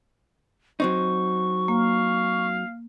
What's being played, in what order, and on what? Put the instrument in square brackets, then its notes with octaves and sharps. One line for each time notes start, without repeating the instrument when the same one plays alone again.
[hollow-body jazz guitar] F#3 C4 D#4 [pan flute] C#6
[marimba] A#3 [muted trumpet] F5